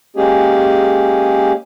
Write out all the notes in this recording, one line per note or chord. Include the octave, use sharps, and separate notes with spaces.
G#3 A#3 C#4 G4 G#4